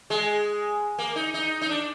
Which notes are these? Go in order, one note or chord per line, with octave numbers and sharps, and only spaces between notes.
G#3
A#3
D#4
D#4
D#4
D4